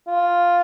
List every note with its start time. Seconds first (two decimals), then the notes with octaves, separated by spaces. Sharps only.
0.08 F4